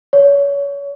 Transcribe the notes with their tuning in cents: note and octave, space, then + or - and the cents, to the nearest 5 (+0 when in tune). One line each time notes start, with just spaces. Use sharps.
C#5 +30